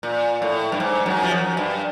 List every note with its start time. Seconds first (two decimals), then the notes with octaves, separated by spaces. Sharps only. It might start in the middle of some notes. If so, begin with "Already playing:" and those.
0.03 A#2
0.42 A2
0.72 G2
0.80 G#2
1.06 F#2
1.23 F3
1.31 F#2
1.57 G2